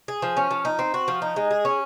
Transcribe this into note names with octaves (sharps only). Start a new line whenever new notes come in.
G#4
F3
C#4
F3
D#4
C4
F#4
F3
D#4
G#3
G#4
C#4